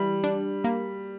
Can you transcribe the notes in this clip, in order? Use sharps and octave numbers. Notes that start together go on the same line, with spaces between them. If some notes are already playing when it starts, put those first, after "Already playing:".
Already playing: E3 G3
D4
A#3